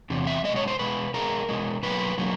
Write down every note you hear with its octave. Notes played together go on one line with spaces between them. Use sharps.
E2 C3
E5
B2 G#3 D#5
C#5
C5
B2 G#3 B4
B2 G#3 A#4
B2 G#3
B2 F#3 A#3 B4
B2 F#3 A#3